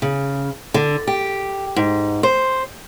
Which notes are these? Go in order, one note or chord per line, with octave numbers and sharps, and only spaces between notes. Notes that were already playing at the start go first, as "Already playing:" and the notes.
C#3
D3
G4
G#2
C5